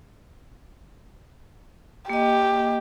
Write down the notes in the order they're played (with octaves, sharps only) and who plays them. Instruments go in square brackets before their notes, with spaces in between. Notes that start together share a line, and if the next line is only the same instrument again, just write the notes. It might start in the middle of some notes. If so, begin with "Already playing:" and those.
[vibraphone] A#3 D#5 [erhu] G4